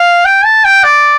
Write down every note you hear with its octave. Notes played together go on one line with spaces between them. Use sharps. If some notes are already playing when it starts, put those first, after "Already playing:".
Already playing: F5
G5
A5
G5
D5